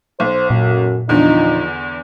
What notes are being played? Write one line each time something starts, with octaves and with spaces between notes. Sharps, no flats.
B1 C5
F#2 A#2
E2 D3 F3 D#4